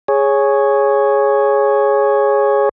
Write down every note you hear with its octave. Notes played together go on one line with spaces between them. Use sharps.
G#4 C#5